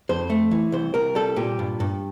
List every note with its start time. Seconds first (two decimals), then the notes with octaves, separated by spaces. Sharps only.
0.09 F2 C5
0.30 A3
0.51 E3
0.72 C2 C5
0.94 C2 A#4
1.15 G3 A4
1.36 A#2 G4
1.59 G2
1.80 G2